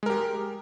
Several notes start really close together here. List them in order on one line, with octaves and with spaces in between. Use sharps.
G#3 A#4 G4